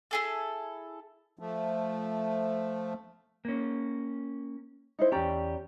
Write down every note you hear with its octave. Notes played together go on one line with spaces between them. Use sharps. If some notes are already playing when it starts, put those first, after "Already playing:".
E4 G#4 A4
F3 A3
A#3 C#4
D#4 E4 C5
E2 C#4 G4 D5 A#5